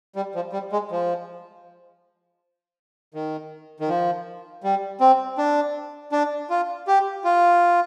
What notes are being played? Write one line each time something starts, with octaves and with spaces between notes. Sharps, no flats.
G3
F3
G3
G#3
F3
D#3
D#3
F3
G3
C4
D4
D4
F4
G4
F4